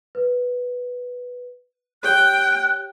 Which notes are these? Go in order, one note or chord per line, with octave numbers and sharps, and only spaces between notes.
B4
G4 C#5 G5 F#6 G6